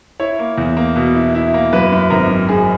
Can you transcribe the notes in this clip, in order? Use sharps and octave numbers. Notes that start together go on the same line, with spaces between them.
E4 C#5
A#3
E2
A#3
B2
E4
E4
A#3
F#2 B4
F#2
G#1 A#4
F#2
F#2 G#4